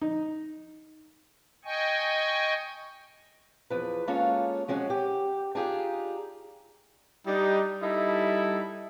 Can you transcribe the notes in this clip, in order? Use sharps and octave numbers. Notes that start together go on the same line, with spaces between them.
D#4
D#5 G5 G#5 C#6
E2 F3 B4
G#3 A#3 C#4 F4 A4 C#5
F3 G#3 C#4 F#4
G4
D4 D#4 F4 G4 G#4
G3 D4 D#4
G3 D#4 E4 A4